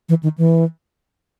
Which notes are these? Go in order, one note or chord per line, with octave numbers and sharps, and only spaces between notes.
E3
D#3
E3